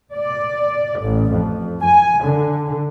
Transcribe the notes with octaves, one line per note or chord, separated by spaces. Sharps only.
D5
A1
F2
G#5
D3